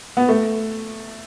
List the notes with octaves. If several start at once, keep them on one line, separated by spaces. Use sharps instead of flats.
B3
A3